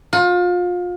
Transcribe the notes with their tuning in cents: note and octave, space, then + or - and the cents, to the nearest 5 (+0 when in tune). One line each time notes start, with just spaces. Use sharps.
F4 +30